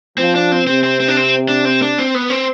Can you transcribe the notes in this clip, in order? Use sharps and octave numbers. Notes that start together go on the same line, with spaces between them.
F3 C4
D4
C4
C3 C4
C4
C4
D4
C4
D4
C4
D4
C4
B3
C4